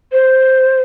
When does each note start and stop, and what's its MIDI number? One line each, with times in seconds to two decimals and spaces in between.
0.12 0.81 72